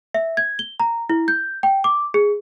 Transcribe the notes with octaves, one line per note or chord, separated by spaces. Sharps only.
E5
G#6
G7
A#5
E4
G6
G5
D6
G#4